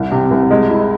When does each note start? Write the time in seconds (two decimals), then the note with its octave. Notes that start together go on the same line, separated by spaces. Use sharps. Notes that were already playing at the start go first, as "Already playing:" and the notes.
Already playing: C2
0.11 C3
0.31 C2
0.51 G#3
0.70 E4